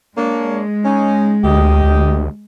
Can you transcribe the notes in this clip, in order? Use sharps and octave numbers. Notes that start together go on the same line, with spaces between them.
G#3 A#3 D4 C#5
C#4 D#4
D2 G4 D#5
D2